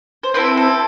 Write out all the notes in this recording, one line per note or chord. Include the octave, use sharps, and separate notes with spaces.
C5
C4 E4 A4 B4
A4